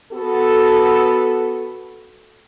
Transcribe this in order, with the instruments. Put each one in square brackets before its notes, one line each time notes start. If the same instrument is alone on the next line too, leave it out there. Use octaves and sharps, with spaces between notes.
[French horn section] B3 F#4 A4